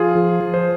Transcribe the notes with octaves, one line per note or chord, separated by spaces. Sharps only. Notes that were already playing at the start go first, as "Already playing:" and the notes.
Already playing: F3 F4 G#4
F3
F3
C5